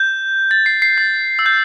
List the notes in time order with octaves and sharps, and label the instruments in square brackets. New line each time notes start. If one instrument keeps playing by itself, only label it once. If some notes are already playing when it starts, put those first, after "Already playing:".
Already playing: [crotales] G6
A6
C7
C7
A6
E6
G6